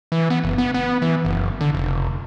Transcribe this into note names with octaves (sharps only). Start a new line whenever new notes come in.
E3
B3
F#1
B3
B3
E3
F#1
D3
F1